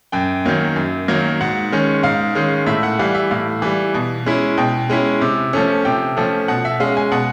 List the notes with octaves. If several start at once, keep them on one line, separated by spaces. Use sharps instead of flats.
F#2 G5
D#3 F#3 A#3
F#2
D#3 F#3 A#3
G#2 F#5
D#3 G#3 C#4
G#2 F5
D#3 G#3 C#4
A2 E5
F#5
E3 G3 F5
E5
A2 F5
E3 G3
B2
G#3 C#4 E4
B2 G5
G#3 C#4 E4
C3
F3 A3 C#4
C3 G5
F3 A3 C#4
B2 F#5
E5
G#3 C#4 F5
G#5
B2 F#5